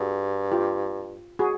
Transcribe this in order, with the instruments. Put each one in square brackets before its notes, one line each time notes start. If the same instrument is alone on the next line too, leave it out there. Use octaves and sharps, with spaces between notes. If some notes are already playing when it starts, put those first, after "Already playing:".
Already playing: [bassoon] G2 [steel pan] F#4 G#4
[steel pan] F4 G4
F#4 G#4